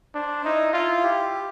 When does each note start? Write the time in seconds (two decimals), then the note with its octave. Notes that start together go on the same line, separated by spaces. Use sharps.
0.15 D4 C5
0.44 D#4 E4
0.73 E4 F4
1.03 G4